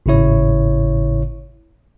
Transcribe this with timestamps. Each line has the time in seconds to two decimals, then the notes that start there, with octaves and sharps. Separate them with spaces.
0.06 G#1 A2 C#3 E4 C#5